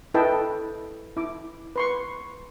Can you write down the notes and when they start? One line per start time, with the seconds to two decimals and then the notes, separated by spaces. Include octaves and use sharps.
0.14 E4 A4 B4 D#5 G5 A5
1.17 E4 D6
1.76 B4 C6 C#6